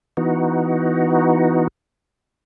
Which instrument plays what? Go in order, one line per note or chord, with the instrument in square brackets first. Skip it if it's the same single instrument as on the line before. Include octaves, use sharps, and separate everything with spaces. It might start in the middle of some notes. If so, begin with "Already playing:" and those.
[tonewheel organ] E3 B3 D#4 F#4